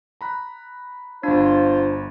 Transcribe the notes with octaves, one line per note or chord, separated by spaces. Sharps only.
A#5 B5 F#6
G1 D4 F4 C5 B5